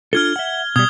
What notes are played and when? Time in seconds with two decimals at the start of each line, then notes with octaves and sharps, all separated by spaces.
0.13 D4 F4 A4 F6 G#6 G7
0.36 E5 F#5
0.76 B2 G3 D#6 G#6 G7